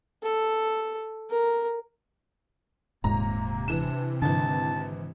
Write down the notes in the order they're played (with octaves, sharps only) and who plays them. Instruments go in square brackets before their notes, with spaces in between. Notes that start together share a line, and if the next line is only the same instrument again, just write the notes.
[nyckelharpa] A4
A#4
[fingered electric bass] D#1 G#2 [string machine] C3 [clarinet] A#3 [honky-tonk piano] A#5
[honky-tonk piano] E3 E7 [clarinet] D4
[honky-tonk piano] G#1 E3 [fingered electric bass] D3 [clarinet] A5